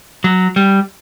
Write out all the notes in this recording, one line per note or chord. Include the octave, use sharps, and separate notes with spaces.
F#3
G3